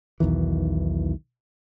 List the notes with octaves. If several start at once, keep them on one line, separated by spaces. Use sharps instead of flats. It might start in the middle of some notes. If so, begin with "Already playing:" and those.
B1 E2 D#3 E3